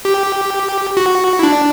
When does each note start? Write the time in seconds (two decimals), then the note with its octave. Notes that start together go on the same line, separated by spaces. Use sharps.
0.05 G4
0.97 F#4
1.39 E4
1.43 D4